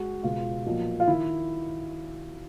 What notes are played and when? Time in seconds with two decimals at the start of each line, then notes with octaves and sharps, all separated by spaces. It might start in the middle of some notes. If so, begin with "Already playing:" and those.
Already playing: G#3 F#4
0.23 C#2 B2 G#3 F4
0.66 B1 A#2 F3
1.00 F4
1.07 D#3 E4